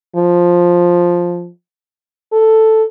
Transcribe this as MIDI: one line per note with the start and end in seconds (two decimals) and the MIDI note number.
0.16 1.48 53
2.33 2.83 69